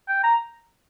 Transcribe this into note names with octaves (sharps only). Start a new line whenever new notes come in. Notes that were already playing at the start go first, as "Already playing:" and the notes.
G5
A#5